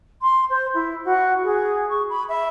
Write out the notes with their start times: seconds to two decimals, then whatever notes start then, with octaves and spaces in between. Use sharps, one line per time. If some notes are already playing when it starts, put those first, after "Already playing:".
0.22 C6
0.50 C5
0.74 E4
1.05 F#4
1.43 G#4
1.89 C#6
2.09 B5
2.29 E5